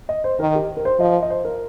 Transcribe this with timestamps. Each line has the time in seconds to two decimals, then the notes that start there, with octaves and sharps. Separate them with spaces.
0.09 D#5
0.24 C5
0.40 D#3 A#4
0.55 G4
0.77 A#4
0.85 C5
1.00 F3 D#5
1.22 D#5
1.30 C5
1.45 A#4